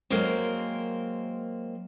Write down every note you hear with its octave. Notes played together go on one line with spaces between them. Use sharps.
F#3 G#3 A#3 C4 A#4 C5